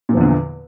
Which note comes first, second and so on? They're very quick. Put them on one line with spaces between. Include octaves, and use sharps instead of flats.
A#2 F3 E2 D3